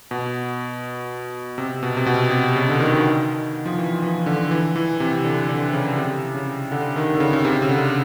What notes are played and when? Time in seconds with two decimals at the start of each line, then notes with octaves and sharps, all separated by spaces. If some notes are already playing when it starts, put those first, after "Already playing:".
0.11 B2
1.58 C3
1.83 B2
1.97 C3
2.06 B2
2.31 C3
2.56 C#3
2.69 D3
2.80 D#3
3.66 F3
3.78 E3
4.02 E3
4.26 D3
4.51 E3
4.76 E3
5.00 C3
5.25 D3
5.49 D3
5.73 C#3
5.98 C3
6.34 C#3
6.72 D3
6.96 D#3
7.15 D3
7.20 C#3
7.33 C#3
7.45 C3
7.62 C#3
7.69 D3